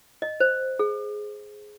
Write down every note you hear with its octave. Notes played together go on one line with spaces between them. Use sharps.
D#5
C5
G#4